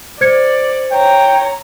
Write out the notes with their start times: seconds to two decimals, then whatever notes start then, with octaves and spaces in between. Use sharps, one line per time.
0.21 C5 D5 G#6 C#7
0.92 C#5 G5 A#5